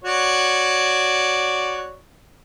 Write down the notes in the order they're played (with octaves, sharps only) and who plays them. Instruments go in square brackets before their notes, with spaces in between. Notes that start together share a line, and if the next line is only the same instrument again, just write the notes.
[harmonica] F#4 C#5 D5